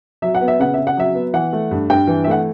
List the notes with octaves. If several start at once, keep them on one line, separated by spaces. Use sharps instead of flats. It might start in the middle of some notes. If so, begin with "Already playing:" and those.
F#3 E5
F#5
B3
E5
C#3 F#5
C#3 E5
F#5
F#3 E5
B3
E3 F#5
A3
G2
G2 G5
E3
E5
A3 F#5